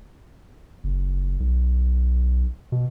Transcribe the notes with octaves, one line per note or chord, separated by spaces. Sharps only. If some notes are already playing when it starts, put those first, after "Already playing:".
F#1
B1
B2